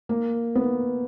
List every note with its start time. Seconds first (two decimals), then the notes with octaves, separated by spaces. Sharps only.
0.09 A#3
0.55 B3